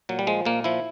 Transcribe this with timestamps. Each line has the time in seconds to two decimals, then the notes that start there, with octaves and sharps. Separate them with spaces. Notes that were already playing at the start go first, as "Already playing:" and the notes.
0.09 A#2 F#3
0.19 G3
0.27 F3 G#3
0.45 A#2 A#3
0.64 F3 E4